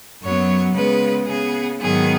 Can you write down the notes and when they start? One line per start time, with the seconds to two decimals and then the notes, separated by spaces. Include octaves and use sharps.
0.22 F#2 F#3 B3 C#5
0.74 C#3 G#3 B3 B4
1.26 C#3 B3 G#4
1.79 G#2 D#3 F#3 B3 G#4